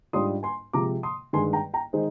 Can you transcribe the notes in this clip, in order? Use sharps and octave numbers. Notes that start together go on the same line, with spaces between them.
G#2 G3 D4 F4 C6 D#6
G#5 C6
C3 F3 G#3 A#5 D6
C6 D#6
G2 D#3 G#3 G#5 C6
G5 A#5
G5 A#5
D#3 G#3 D#4 G#4 C5